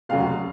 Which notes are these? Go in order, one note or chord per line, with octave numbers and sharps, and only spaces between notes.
F1 D#2 C#3 F#3 F5